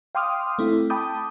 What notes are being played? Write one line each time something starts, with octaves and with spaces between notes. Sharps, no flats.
F5 G5 C6 D6 D#6 F6
A3 C4 E4
G5 A5 B5 D6 D#6 G6